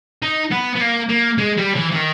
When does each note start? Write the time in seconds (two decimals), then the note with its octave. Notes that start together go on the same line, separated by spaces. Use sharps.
0.22 D#4
0.51 B3
0.76 B3
0.80 A#3
1.09 A#3
1.38 G#3
1.58 G3
1.76 E3
1.92 E3
1.96 D#3